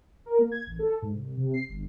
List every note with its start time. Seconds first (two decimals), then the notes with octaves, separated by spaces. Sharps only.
0.26 A#4
0.39 A#3
0.52 G#6
0.67 A1
0.79 A4
1.02 G#2
1.14 C2
1.37 C3
1.54 C7
1.68 G1